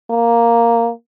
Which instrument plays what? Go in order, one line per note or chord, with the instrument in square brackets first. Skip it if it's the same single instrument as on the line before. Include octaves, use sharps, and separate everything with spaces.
[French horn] A#3